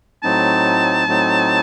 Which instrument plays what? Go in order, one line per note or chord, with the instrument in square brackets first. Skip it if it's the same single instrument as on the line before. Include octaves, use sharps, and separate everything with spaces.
[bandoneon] A2 F#3 A3 C4 D#4 [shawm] A5
[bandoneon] A2 F#3 A3 C4 D#4